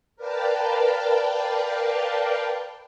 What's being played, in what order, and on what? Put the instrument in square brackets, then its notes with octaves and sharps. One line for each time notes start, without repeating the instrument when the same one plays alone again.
[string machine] A#4 B4 D5 F5 G5 A5